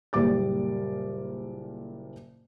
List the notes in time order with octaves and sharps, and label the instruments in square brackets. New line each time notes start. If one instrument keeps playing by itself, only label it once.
[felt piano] F#1 A#2 G3 D6 A6